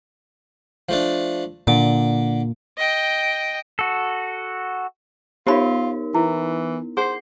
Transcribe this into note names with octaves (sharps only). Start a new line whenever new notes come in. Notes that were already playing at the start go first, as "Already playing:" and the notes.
F3 A3 D4
A#2 D3 D6
D#5 G5
F#4 A4
B3 D#4 F4 G4 A#4 C#5 B5
E3 E4
G#4 C5 F#5 C7